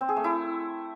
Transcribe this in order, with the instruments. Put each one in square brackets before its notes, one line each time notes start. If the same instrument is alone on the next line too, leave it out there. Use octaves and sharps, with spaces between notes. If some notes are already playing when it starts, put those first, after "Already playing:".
[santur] C4
G#4
A3
E4